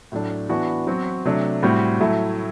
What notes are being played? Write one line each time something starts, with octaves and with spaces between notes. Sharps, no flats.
A2 F#3 A3 D4
E3 B3 D4 F#4
F#3 C4 F#4
C3 F#3 A3 D4
A2 G3 C4 F#4
A2 F#3 A3 E4